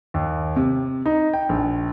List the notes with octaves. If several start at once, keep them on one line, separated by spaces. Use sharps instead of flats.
D#2
C3
D#4
G5
A#1